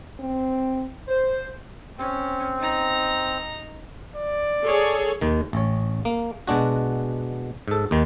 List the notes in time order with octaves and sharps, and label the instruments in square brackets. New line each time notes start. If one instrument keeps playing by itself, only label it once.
[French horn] C4
[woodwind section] C5
[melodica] C4 [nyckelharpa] C#4
[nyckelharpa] D#4 A#5
[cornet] D5
[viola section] G#4 A4 C#5
[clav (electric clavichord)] D#2 D#3
A1 C#5
A#3
B2 G#3 D4 F#4
G#2 A4
D#2 D#3